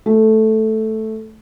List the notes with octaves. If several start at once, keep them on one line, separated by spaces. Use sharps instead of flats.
A3